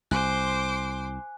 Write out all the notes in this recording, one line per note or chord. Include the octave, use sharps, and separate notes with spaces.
C2 C5 G#5 C6 D6 F#6